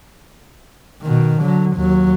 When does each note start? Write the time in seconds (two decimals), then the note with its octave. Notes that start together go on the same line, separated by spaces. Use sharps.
1.02 B2 D#3
1.41 D3 F#3
1.76 D#2 F#3